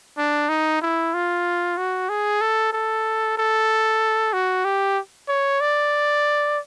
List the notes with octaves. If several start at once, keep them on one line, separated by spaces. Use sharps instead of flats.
D4
D#4
E4
F4
F#4
G#4
A4
A4
A4
F#4
G4
C#5
D5